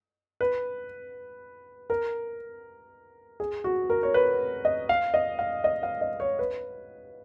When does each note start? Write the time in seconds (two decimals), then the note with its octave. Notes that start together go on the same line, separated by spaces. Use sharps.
0.41 B4
1.90 A#4
3.40 G#4
3.64 F#4
3.90 A#4
4.03 C#5
4.14 B4
4.65 D#5
4.89 F5
5.14 D#5
5.39 F5
5.64 D#5
5.83 F5
6.01 D#5
6.20 C#5
6.39 B4